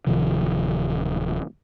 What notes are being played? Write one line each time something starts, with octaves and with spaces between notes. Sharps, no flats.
D1 C3 D#3 F3